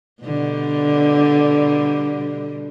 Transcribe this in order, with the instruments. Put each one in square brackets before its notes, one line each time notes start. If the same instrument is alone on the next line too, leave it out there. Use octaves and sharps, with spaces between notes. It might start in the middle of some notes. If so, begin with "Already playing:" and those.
[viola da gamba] B2 D3 G3